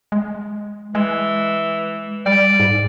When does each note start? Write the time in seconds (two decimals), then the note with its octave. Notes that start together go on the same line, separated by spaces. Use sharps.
0.12 G#3
0.95 E3 G#3
2.26 G3 D5
2.60 G#2